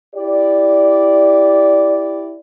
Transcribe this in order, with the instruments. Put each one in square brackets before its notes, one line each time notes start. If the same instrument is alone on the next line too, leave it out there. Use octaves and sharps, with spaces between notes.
[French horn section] E4 G4 D5